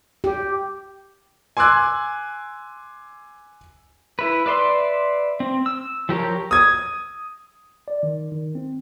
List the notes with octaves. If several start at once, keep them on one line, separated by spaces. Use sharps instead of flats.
G4
G#5 C6 D6 E6 F#6 G#6
E4 B4
B4 D5 E5 C6
C4
E6
F3 G4 A#4 C#5
D#6 G#6
D5
D#3
D#3
C4